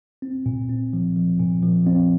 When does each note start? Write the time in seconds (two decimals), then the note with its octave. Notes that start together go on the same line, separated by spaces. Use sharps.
0.22 C4
0.46 A#2
0.69 C4
0.93 F3
1.16 F3
1.40 A#2
1.63 F3
1.87 C4